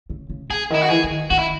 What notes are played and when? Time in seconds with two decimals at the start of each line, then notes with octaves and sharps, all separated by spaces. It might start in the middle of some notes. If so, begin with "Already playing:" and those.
0.10 C#3
0.30 C#3
0.50 C#3 G#4
0.70 D#3 E4
0.82 F#4
0.90 E3 G#4
1.04 E3
1.10 D#3
1.30 D#3 F#4
1.39 E4